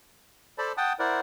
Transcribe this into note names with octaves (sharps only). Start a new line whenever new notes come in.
A4 C5 D5 A5 B5
F#5 G5 A5 D#6
E4 A#4 C5 D5 F#5